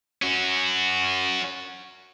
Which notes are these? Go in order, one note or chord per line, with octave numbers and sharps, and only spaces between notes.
C#4 F#4